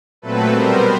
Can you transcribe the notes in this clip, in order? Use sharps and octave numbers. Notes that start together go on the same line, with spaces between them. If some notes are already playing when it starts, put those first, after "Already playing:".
A#2 F#3 A3 C4 A4 B4
B2 G3 B3 A#4 C5